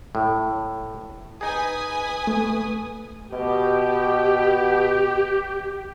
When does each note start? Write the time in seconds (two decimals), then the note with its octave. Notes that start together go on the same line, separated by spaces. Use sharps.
0.15 A2
1.41 D#4 G#4 B4 G#5 D#6
2.27 A3
3.33 B2 G4